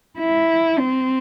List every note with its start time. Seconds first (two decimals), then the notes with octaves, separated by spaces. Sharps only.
0.19 E4
0.78 C4